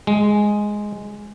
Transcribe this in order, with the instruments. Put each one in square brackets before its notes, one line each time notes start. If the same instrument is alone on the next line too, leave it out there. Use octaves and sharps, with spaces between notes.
[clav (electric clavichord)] G#3